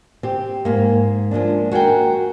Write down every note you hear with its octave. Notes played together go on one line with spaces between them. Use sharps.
C4 G4
G#2 A#3
F3 G#3 A#3 D4
F#4 G#4 A#4 G5